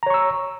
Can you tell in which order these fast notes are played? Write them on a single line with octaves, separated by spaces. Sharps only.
A#5 C#5 C#6 E6